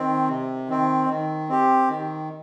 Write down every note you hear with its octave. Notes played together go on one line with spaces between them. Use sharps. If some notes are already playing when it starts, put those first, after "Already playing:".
Already playing: D#3 C4
C3
D#3 C4
D#3
C4 G4
D#3